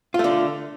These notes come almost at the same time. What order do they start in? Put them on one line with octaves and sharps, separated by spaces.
F4 A3 D3